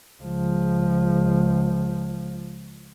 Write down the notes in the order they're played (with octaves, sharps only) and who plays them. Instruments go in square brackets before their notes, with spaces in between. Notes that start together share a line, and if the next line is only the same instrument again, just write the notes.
[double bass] C#2 F3